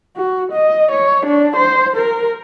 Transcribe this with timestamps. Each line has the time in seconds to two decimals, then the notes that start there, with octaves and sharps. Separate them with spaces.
0.16 F#4
0.52 D#5
0.92 C#5
1.26 D4
1.56 C5
1.96 A#4